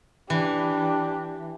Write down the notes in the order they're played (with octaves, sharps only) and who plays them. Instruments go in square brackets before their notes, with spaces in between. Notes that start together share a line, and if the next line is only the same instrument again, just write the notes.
[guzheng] E3 [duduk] D4 [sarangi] G4